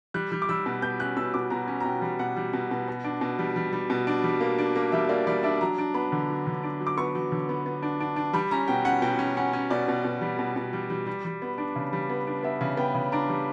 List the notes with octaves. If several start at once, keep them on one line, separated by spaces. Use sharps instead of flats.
G3 F#6
G3
D6
G3 E6
B2
B2 G6
C#4 F#6
B2 E6
B2 D6
B2 A#5
C#4
A#5
B2 G5
G3
B2 F#5
G3
B2
B2
B2
D4
B2
G3
G3
G3
B2
D4
G3
A#3
D4
A#3
G3 E5
A#3 D5
G3 D5
D4 E5
F#3 A#5
D4
B3 B5
D3
F#3
D3
D4
F#3
D6
B3 C#6
F#3
D3
B3
B3
D4
D4
D4
G3 B5
C#4 A#5
B2 G5
C#4 F#5
B2 G5
C#4
C#4 F#5
C#4
B2 D5
B2
B2
G3
B2
B2
G3
G3
G3
G3
B3
D4
C#3
G3
B3
D4
B3 E5
C#3
B3 G5
C#3
D4 A#5
G3